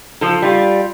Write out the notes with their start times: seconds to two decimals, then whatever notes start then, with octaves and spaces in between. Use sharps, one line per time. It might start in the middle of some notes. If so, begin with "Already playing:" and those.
0.21 F3 A4
0.42 G3 F4